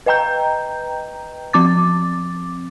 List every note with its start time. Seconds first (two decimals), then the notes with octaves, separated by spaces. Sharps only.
0.06 B4 D#5 G5 A#5 G6
1.53 F3 C4 D6 A6